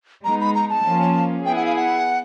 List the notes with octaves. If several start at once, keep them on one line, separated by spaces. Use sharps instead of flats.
G#3 B3 D#4 A#5
B5
A#5
A5
F3 A#3 C#4 F4
B3 E4 G#4 G5
F#5
F5
F#5